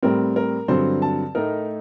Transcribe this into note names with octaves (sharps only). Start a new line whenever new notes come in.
A2 G3 C4 A#4
A#4
G2 D3 F#3 C4 C5
A5
A2 A3 D#4 A#4